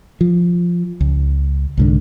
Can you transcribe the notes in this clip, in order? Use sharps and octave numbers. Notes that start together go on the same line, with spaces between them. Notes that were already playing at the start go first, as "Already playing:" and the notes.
F3
C#2
C2 G#2 D3